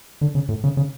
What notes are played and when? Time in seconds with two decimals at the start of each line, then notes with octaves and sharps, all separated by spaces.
0.21 D3
0.35 C#3
0.49 A2
0.64 C#3
0.77 C#3